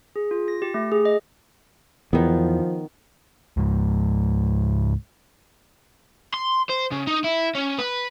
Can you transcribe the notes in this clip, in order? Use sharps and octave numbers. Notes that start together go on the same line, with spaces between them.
G#4
F4
A#6
G4
A3
G#4
D#5
E2 D#3 F3 B3
C#2 G#2
C6
C5
C#3
D#4
E4
C#4
B4